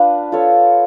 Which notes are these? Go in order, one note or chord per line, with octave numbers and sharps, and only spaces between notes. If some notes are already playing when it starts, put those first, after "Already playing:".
Already playing: D4 F4 B4 F5
F4 A4 C#5